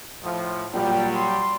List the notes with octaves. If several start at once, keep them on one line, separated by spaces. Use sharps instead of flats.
A2 F3
A#2 F#3 G3 G5
C6